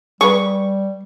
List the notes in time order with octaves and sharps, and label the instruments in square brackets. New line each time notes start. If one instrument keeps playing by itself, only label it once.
[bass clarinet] G3 [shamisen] G#4 B4 [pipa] C#6